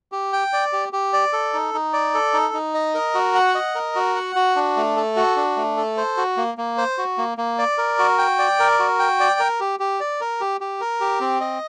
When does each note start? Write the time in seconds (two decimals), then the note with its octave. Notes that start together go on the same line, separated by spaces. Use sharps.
0.12 G4
0.33 G5
0.53 D5
0.73 G4
0.93 G4
1.13 D5
1.33 A4
1.53 D#4
1.74 D#4
1.93 D5
2.14 A4
2.34 D#4
2.54 D#4
2.74 D#5
2.94 A#4
3.15 F#4
3.35 F#5
3.55 D#5
3.75 A#4
3.95 F#4
4.15 F#5
4.36 F#4
4.56 D4
4.77 A3
4.97 A4
5.16 F#4
5.36 D4
5.56 A3
5.77 A4
5.97 C5
6.17 F#4
6.37 A#3
6.58 A#3
6.78 C5
6.98 F#4
7.18 A#3
7.38 A#3
7.58 D5
7.78 A#4
7.99 F#4
8.18 G5
8.39 D5
8.60 A#4
8.79 F#4
8.99 G5
9.20 D5
9.40 A#4
9.60 G4
9.80 G4
10.00 D5
10.21 A#4
10.41 G4
10.61 G4
10.81 A#4
11.01 G4
11.20 C4
11.41 D#5